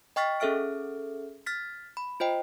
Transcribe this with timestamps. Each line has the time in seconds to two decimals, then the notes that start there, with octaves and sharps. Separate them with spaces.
0.16 D#5 G5 C#6 F6 A6 B6
0.40 C#4 G#4 A4 E5 F6 D7
1.46 F6 A6 B6
1.97 B5
2.20 F4 C5 D#5 G5